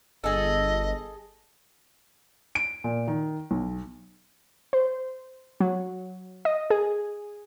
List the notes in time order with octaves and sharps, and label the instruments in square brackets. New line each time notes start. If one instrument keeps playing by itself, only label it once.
[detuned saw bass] G1 [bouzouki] G#4 A4 [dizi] D#5
[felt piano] D7
A#2
D#3
B1
[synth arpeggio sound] C5
F#3
D#5
G#4